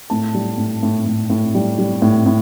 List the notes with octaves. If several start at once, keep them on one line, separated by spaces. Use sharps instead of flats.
A2 A5
G3
A2
A2
A2
A2
G3
G3
A2
A2